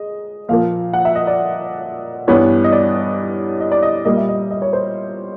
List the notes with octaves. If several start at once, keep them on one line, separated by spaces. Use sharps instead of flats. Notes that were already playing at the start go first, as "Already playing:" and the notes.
Already playing: G#3 D#5
A#2 F3 A#3 F5
F#5
E5
D#5
D5
G2 E3 G3 B3 C#5
D#5
D5
D#5
D5
D#5
A#2 G3 A#3 D#5
E5
D#5
D#5
C#5
C5